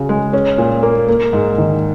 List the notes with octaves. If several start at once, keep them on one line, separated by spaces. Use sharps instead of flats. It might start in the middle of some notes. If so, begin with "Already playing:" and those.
Already playing: C#3 F#4
G#3
C#4
A#2
A#3
A#3
G#2
D#3